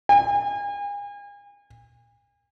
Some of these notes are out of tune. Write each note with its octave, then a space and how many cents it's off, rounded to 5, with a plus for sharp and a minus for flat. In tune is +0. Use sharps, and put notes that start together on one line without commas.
G#5 -40